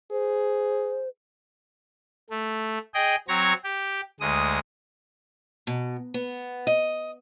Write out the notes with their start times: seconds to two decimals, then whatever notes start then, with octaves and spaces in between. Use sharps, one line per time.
0.11 G#4 C5
2.30 A3
2.94 G#4 D#5 G5
3.28 F#3 C4 A#5 C#6 G#6
3.64 G4
4.20 D2 G#3 D#6
5.67 B2
6.14 B3
6.67 D#5